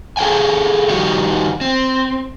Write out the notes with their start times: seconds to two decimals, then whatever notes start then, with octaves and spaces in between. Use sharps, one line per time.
0.17 G#4 A4 F5 G5 G#5
0.89 D#3 G3 D#4 F#4 G4
1.61 C4